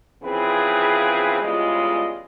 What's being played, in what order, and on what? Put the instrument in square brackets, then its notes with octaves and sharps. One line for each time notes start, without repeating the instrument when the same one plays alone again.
[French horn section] C#3 E3 F3 C4 G#4 B4
E2 C#3 G3 G#3 F4 D#5